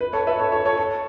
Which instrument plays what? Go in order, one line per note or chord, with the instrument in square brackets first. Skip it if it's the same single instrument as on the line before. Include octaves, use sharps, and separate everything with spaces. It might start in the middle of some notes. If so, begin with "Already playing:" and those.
[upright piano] B4
A4 C#5
B4 E5
A4 C#5
A4 C#5
A4 C#5
A4